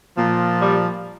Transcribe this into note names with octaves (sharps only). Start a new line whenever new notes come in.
A#2 F3
G3